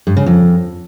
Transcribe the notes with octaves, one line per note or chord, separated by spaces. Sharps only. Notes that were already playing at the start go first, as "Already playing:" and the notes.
G2
C#3
F2